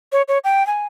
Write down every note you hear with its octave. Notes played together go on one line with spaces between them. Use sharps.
C#5
C#5
G5
G#5